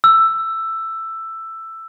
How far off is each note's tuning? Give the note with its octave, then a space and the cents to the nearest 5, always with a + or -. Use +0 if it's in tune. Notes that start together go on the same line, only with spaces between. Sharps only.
E6 +10